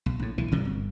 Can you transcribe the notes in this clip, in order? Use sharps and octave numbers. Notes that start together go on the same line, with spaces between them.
B1
A#1 A2
B1 E3
G#1 C3 F#3 G3
G1